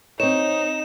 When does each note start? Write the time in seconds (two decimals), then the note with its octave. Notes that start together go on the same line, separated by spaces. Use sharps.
0.20 C4 D#4 C#5 E7